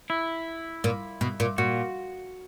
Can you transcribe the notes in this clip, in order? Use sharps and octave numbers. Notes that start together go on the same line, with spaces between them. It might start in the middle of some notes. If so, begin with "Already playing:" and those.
E4
A#2
B2
A#2
A#2 F#4